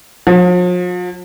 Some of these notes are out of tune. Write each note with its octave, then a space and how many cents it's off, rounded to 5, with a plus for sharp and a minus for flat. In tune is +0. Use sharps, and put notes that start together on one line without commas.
F3 +45